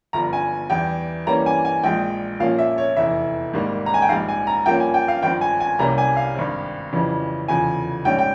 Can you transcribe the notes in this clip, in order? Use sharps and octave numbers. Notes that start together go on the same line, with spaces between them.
G1 G2 F3 A#5
G#5
E2 E3 G3 G5
G2 E3 G3 A#3 C#4 A#5
G#5
G#5
A#1 A#2 G#3 G5
A#1 A#2 F3 A#3 C#4 F5
E5
C#5
F1 E2 E3 E5
G#1 G#2 G3 A#3
A#5
G#5
G5
A#1 G#2 G3 F5
G#5
A#5
G2 F3 A#3 C#4 G5
G#5
G5
F5
G#1 G2 F3 C4 G5
G#5
G#5
C2 C3 G3 A#3 C#4 A#5
G#5
F5
G#1 G2 G3 C4
F2 C#3 E3 G3
F1 E2 C#3 F3 G#5
A#1 G#2 G3 C#4 G5
G5